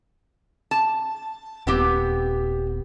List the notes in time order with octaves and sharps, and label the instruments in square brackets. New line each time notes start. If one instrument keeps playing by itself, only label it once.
[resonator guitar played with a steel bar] A5
[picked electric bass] D#1 [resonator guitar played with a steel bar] B3 C4 G4